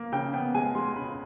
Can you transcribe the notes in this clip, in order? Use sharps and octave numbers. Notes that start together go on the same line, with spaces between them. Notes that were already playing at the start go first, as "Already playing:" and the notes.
Already playing: A#3
C#3 G5
B3 G5
G#3 G#5
G#3 C6
C#3 B5